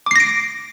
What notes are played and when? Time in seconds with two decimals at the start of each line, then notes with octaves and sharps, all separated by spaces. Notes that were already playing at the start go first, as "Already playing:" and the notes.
0.06 D6
0.11 C7
0.16 A#6
0.20 D7